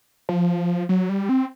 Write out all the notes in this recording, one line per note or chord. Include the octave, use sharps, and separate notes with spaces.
F3
F#3
G3
C4